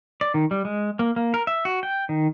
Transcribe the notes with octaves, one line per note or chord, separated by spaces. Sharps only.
D5
D#3
G3
G#3
A#3
A#3
A#4
E5
F#4
G5
D#3